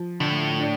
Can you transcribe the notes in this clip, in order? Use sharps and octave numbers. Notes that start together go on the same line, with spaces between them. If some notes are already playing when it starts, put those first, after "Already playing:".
Already playing: F3
A2 D3
D4